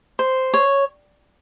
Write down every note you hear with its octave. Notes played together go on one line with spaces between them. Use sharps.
C5
C#5